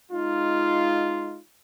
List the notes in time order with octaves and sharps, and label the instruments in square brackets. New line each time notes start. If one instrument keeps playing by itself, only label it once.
[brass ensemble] G#3 D#4 F4